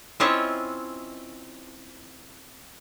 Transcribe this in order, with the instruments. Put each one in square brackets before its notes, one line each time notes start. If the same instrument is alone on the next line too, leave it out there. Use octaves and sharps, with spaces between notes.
[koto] C4 C#4 E4 F4 C#5 D#5